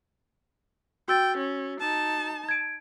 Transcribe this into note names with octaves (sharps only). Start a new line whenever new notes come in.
F#4 G5 E6 A6
C#4
D#4 A5
G#6 D7